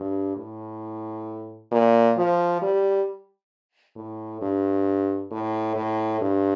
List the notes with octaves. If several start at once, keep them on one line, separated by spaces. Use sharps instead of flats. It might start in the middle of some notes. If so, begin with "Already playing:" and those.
Already playing: G2
A2
A#2
F3
G3
A2
G2
A2
A2
G2